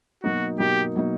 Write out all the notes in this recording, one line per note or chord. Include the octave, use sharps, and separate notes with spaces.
B2 F#3 A#3 D#4 F#4
B2 F#3 A#3 D#4 G4
B2 F#3 A#3 D#4